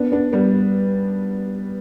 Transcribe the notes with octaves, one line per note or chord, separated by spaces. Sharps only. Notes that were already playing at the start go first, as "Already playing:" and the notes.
Already playing: B3 D4
B3 D4
G3 B3